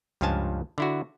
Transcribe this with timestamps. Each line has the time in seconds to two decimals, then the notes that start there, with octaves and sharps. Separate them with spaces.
0.21 C#2 G2 F3 F5 G#5 A5
0.78 D3 E4 F#4